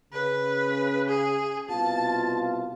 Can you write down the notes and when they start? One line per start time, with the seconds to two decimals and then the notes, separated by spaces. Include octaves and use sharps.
0.12 C#3 B4
1.08 G#4
1.69 C2 B2 F4 A5